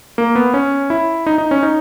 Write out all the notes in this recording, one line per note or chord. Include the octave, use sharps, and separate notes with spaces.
A#3
B3
C#4
E4
D#4
D#4
C#4
D#4